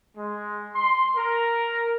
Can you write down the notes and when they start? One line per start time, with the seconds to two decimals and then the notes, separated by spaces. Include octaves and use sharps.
0.17 G#3
0.75 C6
1.16 A#4